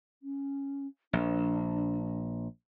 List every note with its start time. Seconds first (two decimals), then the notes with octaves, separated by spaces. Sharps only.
0.23 C#4
1.13 A#1 D4